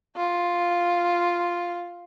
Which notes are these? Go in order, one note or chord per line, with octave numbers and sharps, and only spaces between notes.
F4